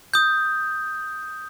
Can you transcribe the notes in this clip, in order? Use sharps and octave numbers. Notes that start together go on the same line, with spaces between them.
D#6 G6